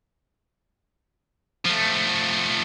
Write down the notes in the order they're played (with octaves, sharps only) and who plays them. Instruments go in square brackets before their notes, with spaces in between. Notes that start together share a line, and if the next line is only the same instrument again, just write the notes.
[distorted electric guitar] F3 A3